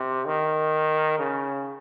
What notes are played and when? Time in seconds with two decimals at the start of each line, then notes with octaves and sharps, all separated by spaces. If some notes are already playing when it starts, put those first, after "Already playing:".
Already playing: C3
0.26 D#3
1.18 C#3